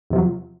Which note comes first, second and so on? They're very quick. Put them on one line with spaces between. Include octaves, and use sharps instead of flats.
E2 C3 F3 F#3